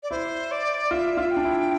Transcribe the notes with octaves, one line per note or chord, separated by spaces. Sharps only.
D5
E4 C5
D5
F4 E5
F4
G5
D4
E4